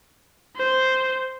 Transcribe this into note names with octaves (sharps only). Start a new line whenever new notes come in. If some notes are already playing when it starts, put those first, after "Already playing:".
C5